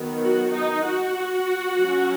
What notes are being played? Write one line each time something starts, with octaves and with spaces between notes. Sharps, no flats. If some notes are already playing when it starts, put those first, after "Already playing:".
Already playing: D#3 F#3 B3
F#4
D#4
F#4
F#3 C#4